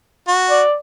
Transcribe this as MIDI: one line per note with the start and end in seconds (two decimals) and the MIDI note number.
0.28 0.61 66
0.50 0.75 74